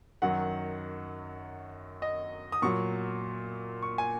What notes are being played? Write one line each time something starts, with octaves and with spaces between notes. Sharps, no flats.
F#2 D#3 F#3 F#5
D#5
D#6
A#2 F#3 C#6
C#6
G#5